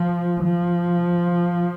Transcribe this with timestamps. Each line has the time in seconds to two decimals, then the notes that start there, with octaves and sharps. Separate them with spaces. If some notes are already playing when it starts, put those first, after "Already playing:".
Already playing: F3
0.43 F3